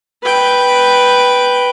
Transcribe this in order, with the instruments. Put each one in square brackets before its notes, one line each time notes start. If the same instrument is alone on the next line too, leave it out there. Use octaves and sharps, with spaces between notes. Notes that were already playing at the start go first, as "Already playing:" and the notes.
[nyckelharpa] B4 G5